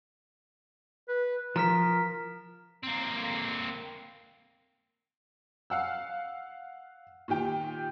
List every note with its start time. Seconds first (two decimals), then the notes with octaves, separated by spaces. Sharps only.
1.08 B4
1.56 F3 A#4 A#5 F6 B6
2.83 A#3 C4
5.70 F5 F#5 E6
7.28 A#2 D#3 G4 G5